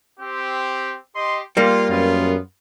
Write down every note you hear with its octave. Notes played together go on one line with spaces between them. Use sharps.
C4 G4
G4 D#5 C6
G3 A#3 F4
F#2 B3 F4